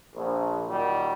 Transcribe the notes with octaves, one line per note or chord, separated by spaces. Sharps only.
A#1
A#2 D#3 F#3 G3